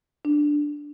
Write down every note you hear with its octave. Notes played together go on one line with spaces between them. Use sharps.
D4